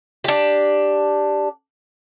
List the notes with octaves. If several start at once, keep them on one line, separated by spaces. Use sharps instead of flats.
D4 G4